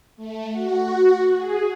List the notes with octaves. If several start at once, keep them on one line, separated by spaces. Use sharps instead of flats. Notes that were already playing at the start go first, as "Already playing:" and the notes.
A3
F#4
G#4